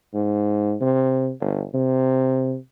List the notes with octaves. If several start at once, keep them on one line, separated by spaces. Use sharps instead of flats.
G#2
C3
G1
C3